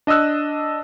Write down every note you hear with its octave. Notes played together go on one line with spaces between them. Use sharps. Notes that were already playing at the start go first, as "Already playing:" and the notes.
D4 D#5 D#6 E6 F#6